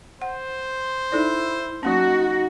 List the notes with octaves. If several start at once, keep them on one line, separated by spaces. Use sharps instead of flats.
C5 F#5
D#4 E4 A4 D5
F#3 A#3 C#4 D#4 F#4